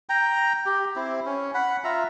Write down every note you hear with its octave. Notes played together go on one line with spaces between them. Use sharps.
G5 A#5
G4
C4 E4
C#4
F#5 B5
F4 E5 A#5